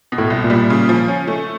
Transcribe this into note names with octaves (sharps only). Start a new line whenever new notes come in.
B2
A2
C2
A#2
G3
C#3
F3
C#4
A3